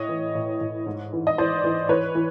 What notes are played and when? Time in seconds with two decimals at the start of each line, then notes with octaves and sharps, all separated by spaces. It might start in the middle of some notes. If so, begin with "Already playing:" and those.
Already playing: A2 C#5 D#5
0.09 E3
0.35 A2
0.61 A2
0.86 G#2
1.13 E3
1.27 D#5
1.38 E3 C5 D5
1.64 E3
1.89 E3 B4 C#5
2.15 E3